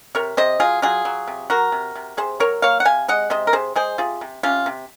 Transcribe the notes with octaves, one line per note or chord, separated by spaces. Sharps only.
C3 A#4 C#5
C3 C5 D#5
F#3 F4 G#4
F#3 F4 G#4
F#3
C3
F#3 F#4 A#4
C3
C3
C3 G#4 C5
F#3 A#4 C#5
A#3 C#5 F5
F#5
C3 F5 G#5
G#3 D#5 F#5
C3 C5 D#5
A#4
C3 G#4 C5
G#3 G#4 C5
C3 F4 G#4
C3
C3 C#4 F4
C3